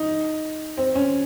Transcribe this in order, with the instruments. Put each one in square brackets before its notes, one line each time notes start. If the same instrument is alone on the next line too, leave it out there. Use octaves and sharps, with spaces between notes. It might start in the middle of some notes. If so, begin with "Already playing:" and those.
Already playing: [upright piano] D#4
C4
C#4